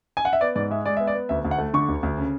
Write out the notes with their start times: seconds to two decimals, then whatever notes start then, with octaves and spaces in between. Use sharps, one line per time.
0.17 G#5
0.25 F#5
0.33 E5
0.41 B3 D5
0.56 G#2 D5
0.71 G#3 E5
0.86 G#3 D5
0.97 B3 E5
1.07 D5
1.15 B3
1.29 D2 E5
1.45 D2
1.51 F#5
1.58 A3
1.74 D3 C#6
1.88 D2
2.03 D2
2.18 C#3